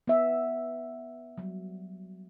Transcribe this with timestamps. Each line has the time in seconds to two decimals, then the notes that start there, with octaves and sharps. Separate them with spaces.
0.08 B3 E5
1.38 F#3 G3